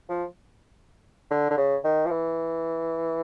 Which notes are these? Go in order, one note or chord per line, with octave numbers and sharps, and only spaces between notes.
F3
D3
D3
C#3
D#3
F3
E3